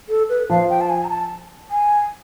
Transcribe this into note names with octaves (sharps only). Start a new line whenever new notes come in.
A4
B4
F3 F5
G5
A5
G#5
A#5
A5
G#5